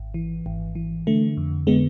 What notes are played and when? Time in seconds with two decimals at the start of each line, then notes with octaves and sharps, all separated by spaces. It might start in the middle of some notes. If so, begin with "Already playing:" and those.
Already playing: G#1
0.14 E3
0.46 G#1
0.75 E3
1.07 D3 A3
1.37 F2
1.67 D3 G#3 B3